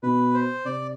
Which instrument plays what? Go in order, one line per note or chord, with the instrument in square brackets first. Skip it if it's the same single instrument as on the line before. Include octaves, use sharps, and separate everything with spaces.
[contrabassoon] B2 [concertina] B4
[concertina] C5
[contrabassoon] C3 [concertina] D5